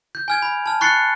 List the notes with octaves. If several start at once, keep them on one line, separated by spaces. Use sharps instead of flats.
G6
G#5 F6 G#6
B5
A5 F6
B5 C#6 F#6 A6 C7 C#7